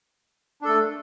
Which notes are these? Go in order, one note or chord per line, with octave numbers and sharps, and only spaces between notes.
A3 D4 A4